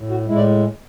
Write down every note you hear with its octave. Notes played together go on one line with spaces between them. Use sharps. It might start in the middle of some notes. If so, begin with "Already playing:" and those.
Already playing: A2
F#4
A2 G#3 E4
D5